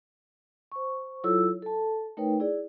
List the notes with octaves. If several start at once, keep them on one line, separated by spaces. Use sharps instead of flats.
C5 C#6
F#3 E4 F4 A4 C#5 E6
A4 A5
A3 D#4 A#4 B4 C#5 G5
E4 G#4 D5